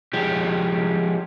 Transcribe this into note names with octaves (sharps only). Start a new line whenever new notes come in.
F3 G#3 G4